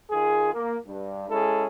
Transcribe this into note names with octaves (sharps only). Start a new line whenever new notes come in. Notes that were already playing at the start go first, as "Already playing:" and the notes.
D#3 F4 G#4
A#3
G2
G#3 C#4 E4 G#4 A4